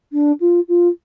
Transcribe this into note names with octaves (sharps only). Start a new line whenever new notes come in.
D4
F4
F4